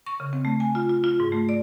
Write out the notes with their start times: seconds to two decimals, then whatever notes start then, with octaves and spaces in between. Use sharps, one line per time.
0.06 C#6
0.20 C#3
0.33 C4
0.45 A3
0.60 G#5
0.75 F4
0.89 F4
1.04 F4
1.20 G#2
1.32 A3
1.49 D5